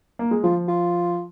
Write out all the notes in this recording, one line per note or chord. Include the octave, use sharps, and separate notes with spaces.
A#3
G#3
F3 F4
F4